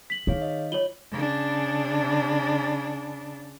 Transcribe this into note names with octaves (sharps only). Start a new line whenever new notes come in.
B6 F#7
D#3 G#4 C#5 F5
D#5
F4 C#5 F#7 G7
C#3 D4